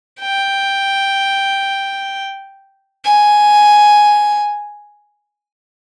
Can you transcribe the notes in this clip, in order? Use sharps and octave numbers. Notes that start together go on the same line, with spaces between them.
G5
G#5